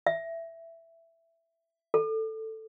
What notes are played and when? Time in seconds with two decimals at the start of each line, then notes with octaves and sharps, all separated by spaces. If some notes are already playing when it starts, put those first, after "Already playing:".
0.07 E5
1.94 A4